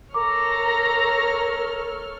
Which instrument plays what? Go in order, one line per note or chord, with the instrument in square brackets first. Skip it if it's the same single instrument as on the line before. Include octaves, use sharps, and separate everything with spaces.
[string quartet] A4 C#5 F6 [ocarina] A#4 [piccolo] A#5 [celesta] D6